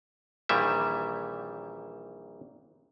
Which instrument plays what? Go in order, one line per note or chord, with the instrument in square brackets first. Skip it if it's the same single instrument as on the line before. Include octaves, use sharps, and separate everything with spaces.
[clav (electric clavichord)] A#1 A#2 D#3 E3 G3 E5